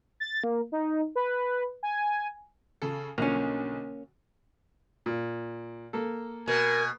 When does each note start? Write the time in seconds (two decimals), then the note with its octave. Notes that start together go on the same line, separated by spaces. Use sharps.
0.20 A6
0.44 A#3
0.72 D#4
1.16 B4
1.83 G#5
2.82 C#3 A4
3.18 B1 D3 F3 A#3 C#4
5.06 A#2
5.93 A#3 A4
6.48 B2 A#4 G#5